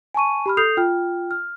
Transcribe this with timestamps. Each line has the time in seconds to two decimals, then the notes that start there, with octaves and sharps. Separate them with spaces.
0.14 G#5 A5 C#6 D#7
0.46 G4 B5 F6
0.57 A4 D#6 G6 C7 F7
0.77 F4 G5 F6
1.31 F6